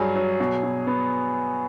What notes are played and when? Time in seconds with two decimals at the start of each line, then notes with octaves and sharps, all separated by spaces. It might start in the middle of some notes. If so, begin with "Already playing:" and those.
Already playing: G2 F#3 G#4
0.16 F#3
0.40 B2
0.63 B2
0.87 B3